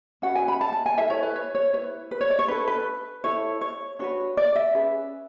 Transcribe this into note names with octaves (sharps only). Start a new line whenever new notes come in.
C#4 F#4 B4 F#5
G#5
B5
A5
A5
G#5
E4 A4 E5
C#5
B4
C#5
C#5
E4 B4 C#5
B4
C#5
D5
C#5
D4 A4 B4
B4
E4 A4 C#5
C#5
D4 F#4 B4 C#5
D5
E5
C#4 G#4 B4